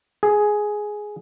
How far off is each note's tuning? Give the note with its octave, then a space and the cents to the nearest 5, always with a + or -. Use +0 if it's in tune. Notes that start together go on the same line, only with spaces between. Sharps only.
G#4 +10